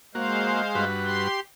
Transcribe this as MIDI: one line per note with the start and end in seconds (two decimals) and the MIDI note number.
0.15 0.84 56
0.15 0.62 58
0.15 0.62 66
0.15 0.84 72
0.15 0.84 77
0.75 1.28 43
0.75 1.28 66
0.75 1.28 71
1.05 1.40 67
1.05 1.40 84